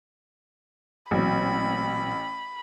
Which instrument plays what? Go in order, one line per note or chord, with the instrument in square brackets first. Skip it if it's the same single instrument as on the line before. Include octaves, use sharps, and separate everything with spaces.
[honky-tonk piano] A1 [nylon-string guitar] A#2 F#3 C4 [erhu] B5